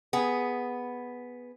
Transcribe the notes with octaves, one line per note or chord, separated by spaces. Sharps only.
B3 G#4